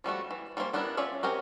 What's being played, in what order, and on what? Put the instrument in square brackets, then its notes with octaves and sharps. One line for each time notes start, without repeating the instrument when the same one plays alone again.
[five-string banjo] F3 G3 A3 F#4
E3
G3 A#3 C#4 E4 C5
G3 B3 D4 E4 A#4
C#4 F4 D5 E5
C4 C#4 G4 A#4 D#5